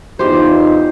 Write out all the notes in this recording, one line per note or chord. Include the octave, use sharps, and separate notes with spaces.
E2 D#4 F4 G4 C5